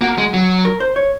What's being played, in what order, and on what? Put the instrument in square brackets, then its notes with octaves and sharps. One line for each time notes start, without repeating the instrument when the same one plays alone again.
[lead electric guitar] A#3 [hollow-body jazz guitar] F#4
[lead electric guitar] G#3
F#3
[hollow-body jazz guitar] A#4
C5
C#5